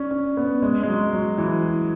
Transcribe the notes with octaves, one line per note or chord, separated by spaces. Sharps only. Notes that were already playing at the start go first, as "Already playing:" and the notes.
Already playing: C#4 D4
C#4
B3
G#3
G#3
F#3
F#3
E3